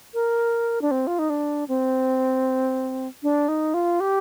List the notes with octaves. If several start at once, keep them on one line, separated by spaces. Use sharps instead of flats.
A#4
D4
C4
F4
D#4
D4
C4
D4
D#4
F4
G4